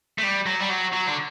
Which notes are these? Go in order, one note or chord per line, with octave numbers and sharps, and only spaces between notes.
A3
G3
F#3
G3
F#3
F#3
D3